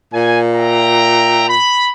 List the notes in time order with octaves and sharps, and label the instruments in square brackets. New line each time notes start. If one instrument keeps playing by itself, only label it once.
[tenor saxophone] A#2 [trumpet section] G#5
[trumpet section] E5 G5 A#5
B5